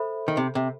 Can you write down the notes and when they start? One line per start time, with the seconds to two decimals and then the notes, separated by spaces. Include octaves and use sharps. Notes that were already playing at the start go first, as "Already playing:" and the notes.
Already playing: A4 C5 E5 B5
0.28 D#3
0.37 C3
0.55 C3